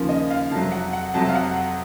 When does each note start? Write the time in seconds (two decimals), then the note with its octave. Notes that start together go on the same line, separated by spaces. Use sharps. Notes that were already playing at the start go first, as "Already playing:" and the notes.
Already playing: D#2 C#3 F3 A#3 C#4
0.09 D#5
0.30 F5
0.51 F2 C3 F#3 A5
0.72 F#5
0.93 F#5
1.14 F2 C3 F#3 A5
1.28 F5
1.35 F#5